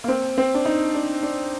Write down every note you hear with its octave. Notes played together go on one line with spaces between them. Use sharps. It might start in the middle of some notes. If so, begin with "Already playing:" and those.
A#3
C4
C4
D4
D#4
D4
D4